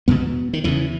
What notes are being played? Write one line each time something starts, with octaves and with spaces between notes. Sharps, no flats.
E2 B2 B3
D#3
E2 C#3 E3